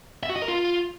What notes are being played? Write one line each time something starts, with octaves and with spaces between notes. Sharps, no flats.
E5
F#4
D#5
A#4
F4